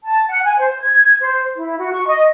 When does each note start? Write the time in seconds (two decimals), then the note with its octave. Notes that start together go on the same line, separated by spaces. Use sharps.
0.05 A5
0.29 F#5
0.45 G#5
0.59 C5
0.81 G#6
1.22 C5
1.57 E4
1.79 F#4
1.92 C#6
2.08 D#5